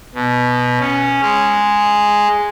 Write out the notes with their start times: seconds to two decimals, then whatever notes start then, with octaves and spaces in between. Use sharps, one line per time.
0.15 B2
0.80 C#4
1.22 G#3